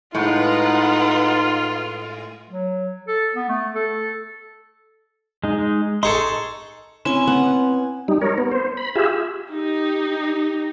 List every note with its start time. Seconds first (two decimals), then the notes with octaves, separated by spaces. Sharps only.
0.15 A2 G#3 D#4 F4 B4 F#5
2.49 F#3
3.08 A4
3.35 B3
3.49 A3
3.75 A4
5.44 G#3 D#4
6.03 D#4 G#4 A4 C6 C#6
7.05 C4 C#4 E4 G#5
7.27 B3 C#4 F#5
8.08 G3 D#4
8.21 A#4 C#5
8.38 B3
8.52 C5
8.77 B5
8.95 F4 G4 G#4 E5
9.48 D#4 G4